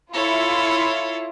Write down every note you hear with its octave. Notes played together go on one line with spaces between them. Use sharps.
E4 F4 A4 C#5